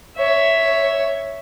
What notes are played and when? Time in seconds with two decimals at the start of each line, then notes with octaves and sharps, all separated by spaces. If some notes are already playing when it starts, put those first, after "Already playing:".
0.17 C#5 E5